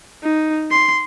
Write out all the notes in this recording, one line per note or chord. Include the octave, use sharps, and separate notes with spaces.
D#4
C6